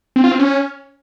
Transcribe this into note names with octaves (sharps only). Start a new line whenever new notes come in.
C4
F4
C4
C#4